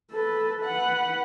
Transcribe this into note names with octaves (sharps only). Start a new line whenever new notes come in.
A4 B4
B4 F#5